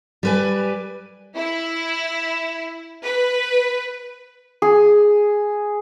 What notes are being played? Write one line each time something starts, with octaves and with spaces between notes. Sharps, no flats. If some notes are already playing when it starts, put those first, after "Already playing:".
G3 B4 G#5
E4
B4
G#4